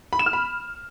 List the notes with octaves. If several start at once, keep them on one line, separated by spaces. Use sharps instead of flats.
B5
E7
F6
B5